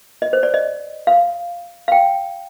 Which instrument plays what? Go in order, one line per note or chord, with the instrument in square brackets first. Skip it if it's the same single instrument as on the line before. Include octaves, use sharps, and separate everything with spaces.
[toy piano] D#5
C5
D5
D#5
F5
F5
G5